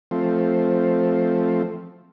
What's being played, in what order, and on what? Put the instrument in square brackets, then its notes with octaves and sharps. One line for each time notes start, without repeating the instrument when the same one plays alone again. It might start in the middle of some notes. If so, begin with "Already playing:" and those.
[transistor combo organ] F3 A3 C4